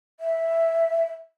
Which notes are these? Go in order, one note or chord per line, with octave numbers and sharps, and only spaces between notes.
E5